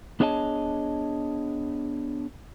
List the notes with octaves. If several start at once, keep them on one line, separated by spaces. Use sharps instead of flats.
B3 D4 G#4 C#5 D#5 A5